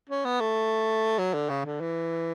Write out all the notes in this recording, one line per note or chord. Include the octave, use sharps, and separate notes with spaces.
C#4
B3
A3
F#3
D3
C#3
D3
E3